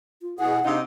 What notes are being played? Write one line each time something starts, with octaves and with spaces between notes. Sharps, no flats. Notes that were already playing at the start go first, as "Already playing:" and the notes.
F4
B2 E4 G#4 F#5
C3 D4 D#4 F5